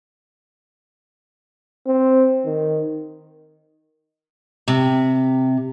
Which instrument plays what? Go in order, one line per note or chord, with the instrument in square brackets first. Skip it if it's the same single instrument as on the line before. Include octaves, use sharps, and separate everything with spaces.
[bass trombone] C4
D#3
[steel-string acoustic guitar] C3